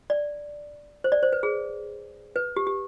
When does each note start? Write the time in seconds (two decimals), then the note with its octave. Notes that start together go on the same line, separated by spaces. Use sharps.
0.10 D5
1.04 C5
1.12 D5
1.23 C5
1.32 B4
1.43 G#4
2.36 B4
2.56 G4
2.67 G4